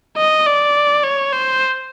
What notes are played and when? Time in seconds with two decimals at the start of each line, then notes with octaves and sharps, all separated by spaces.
0.17 D#5
0.46 D5
1.04 C#5
1.33 C5